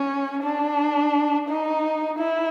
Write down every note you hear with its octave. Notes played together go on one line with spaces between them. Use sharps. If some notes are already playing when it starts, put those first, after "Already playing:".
Already playing: C#4
D4
D#4
E4